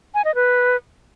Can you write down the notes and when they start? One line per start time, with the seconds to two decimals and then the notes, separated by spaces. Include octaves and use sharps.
0.14 G#5
0.25 D#5
0.35 B4